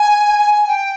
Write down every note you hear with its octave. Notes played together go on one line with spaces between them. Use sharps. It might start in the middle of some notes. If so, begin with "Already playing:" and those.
Already playing: G#5
G#5
G5